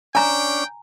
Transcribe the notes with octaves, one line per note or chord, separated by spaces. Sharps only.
C#4 D4 G5 G#5 A#5